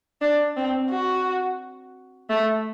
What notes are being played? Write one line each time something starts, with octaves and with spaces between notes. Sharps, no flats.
D4
C4
F#4
A3